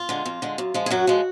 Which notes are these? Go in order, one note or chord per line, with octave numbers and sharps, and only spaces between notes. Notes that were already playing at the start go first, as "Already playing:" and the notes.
Already playing: F4
D3 G#3
F2
D3 G#3
F#2
F3 G#3
G#4
F#2 F#3 F#4
F3 G#3